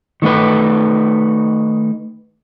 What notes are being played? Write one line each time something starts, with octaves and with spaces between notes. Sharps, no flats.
D#3 A3 D#4 B4